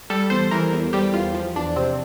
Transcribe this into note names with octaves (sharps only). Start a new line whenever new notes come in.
G3 A4
E2 C5
E3 A#4
E2
G3 G4
E2 F4
F3
E2 D4
C3 C4